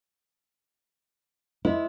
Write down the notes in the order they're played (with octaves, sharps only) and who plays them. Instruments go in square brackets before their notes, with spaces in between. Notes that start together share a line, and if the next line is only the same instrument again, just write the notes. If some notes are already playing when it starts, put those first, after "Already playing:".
[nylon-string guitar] E4 [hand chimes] C5 D#5